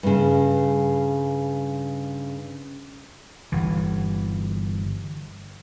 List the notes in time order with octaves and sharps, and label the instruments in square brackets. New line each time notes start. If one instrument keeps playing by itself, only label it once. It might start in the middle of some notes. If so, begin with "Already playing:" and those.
[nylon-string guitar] G2 C#3
[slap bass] G1 E3